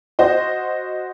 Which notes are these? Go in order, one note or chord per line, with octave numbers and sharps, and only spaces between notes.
F#4 C5 D#5